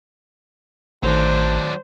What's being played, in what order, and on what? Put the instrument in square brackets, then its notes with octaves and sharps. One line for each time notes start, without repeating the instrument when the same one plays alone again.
[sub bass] A1 [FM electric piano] D#3 A3 [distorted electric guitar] F#3 D4 [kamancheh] C5